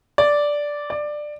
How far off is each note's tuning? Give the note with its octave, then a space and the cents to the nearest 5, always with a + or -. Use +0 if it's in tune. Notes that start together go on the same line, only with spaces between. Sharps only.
D5 -5
D5 +15